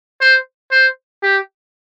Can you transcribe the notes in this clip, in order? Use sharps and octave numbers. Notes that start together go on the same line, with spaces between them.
C5
C5
G4